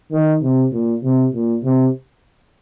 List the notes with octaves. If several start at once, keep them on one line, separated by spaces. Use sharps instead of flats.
D#3
C3
A#2
C3
A#2
C3